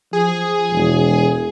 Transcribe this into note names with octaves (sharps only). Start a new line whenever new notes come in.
F3 G#4
E1